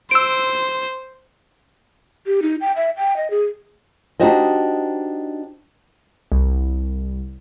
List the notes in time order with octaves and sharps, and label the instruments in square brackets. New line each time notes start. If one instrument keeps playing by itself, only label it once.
[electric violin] C5 [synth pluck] E6 D7
[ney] G4
D#4
G5
E5
G5
D#5
G#4
[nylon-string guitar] D4 D#4 F#4 G4 C5 D#5
[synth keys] C2